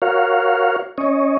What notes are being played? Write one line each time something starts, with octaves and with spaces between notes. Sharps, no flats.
F#4 A#4 C#5 F5
C#4 C#5 D#5